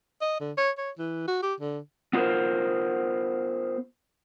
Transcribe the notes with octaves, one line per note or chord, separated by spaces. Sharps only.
D#5
D3
C#5
C#5
E3
F#4
G4
D3
B3 F4 G4 A4 A#4 C5